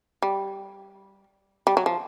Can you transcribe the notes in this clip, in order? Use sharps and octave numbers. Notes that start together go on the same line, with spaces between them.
G3
G3
F#3
F3